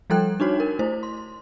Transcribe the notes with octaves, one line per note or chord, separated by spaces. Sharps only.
F3 G3 A4 G5 F#6
D4 D#4 F#4 C#5
A#4
A3 E4 C5
C6